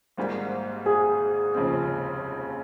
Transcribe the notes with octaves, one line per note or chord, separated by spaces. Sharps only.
G#1 G#2 G3 A#3
G#4
F1 D#2 C#3 F3 C4